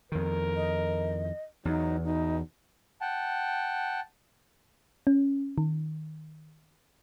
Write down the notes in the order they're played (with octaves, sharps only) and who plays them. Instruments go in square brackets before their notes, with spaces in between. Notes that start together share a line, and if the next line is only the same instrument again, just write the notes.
[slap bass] F2 D#3 [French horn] A#4
[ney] D#5
[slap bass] E2 [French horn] F#3 [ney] D#4
[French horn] B2 [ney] D#4
[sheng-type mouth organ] F#5 G5 A5
[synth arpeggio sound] C#4
D#3